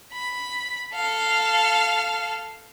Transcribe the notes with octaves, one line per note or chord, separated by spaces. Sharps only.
B5
A4 F5